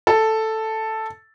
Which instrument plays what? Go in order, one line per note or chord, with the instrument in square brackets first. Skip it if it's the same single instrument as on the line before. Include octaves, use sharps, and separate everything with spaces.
[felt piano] A4